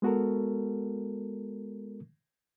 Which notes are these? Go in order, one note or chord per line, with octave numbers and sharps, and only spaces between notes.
G#3 B3 F#4 A4 A#4